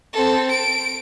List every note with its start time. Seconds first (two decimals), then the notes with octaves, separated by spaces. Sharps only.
0.13 C4 A4
0.51 D7